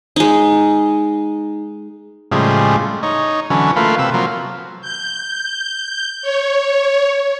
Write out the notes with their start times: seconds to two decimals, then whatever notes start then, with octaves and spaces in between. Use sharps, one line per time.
0.16 G#3 D#4
2.32 A2 C#3 F3 G3 G#3
3.03 D#4 C#5
3.50 D3 E3 F#3 C#4
3.76 A3 A#3 F4 B4
3.99 C3 B4 E6
4.14 F3 F#3 A#3
4.82 G6
6.22 C#5